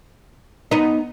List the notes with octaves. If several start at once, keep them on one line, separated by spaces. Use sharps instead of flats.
B3 D#4